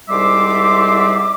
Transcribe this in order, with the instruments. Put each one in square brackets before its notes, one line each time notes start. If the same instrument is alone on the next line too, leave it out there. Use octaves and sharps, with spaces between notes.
[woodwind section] C2 G#2 G3 C5 E5 D6